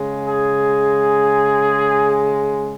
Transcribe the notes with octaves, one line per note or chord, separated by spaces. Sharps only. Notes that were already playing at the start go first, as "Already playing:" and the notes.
Already playing: C#3 G#3
G#4